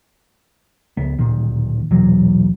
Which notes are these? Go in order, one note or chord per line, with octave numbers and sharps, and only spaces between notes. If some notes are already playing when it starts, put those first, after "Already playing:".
C#2 B3
D1 A#2 D#3
B1 E2 A#2 F#3